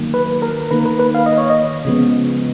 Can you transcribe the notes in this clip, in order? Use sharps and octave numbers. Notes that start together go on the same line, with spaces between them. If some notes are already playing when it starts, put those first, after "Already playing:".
Already playing: D#3 F#3 A#3
B4
A#4
D#3 A#3 B4
B4
B4
F5
D#5
C#5
D#5
C#3 F3 G#3 B3